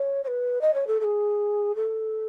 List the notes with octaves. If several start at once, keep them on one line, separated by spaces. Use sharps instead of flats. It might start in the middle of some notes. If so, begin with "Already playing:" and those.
Already playing: C#5
C#5
B4
D#5
C#5
A4
A4
G#4
A4